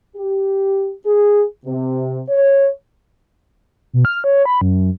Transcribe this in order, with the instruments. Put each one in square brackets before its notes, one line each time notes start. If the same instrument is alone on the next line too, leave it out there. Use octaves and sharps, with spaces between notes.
[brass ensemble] G4
G#4
C3
C#5
[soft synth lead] B2
F6
C#5
B5
F#2